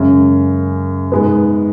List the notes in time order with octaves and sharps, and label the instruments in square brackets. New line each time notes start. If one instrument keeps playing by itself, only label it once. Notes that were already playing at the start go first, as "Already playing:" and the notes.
Already playing: [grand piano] F#2 C#3 G#3 C#4
G#2 G#3 B3